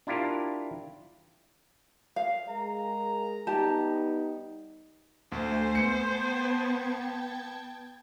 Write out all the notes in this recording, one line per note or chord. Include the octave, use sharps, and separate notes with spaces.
D4 E4 F4 G4 A#4
F5
G#3 G#4 A#4 A#5
G3 B3 D#4 G4 A5
D2 A3 C5 G#5
B3 C#7
G5 A5 G#6